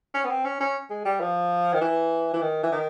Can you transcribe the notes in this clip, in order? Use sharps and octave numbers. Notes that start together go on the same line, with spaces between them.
C#4
B3
C4
C#4
C#4
G#3
G3
F3
D#3
E3
E3
D#3
E3
D#3